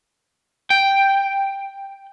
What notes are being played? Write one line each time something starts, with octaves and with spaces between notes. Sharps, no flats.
G5